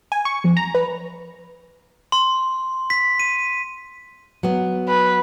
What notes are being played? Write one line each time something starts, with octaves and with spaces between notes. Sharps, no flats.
G#5
C#6
F2
A#5
B4
C6
B6
D#7
F#3 B3
B4